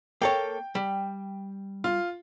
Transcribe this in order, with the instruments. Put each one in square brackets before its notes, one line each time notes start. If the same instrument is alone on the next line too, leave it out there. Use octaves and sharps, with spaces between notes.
[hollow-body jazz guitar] A#3 A4 C#5 [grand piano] G5
[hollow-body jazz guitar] G3
[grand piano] F4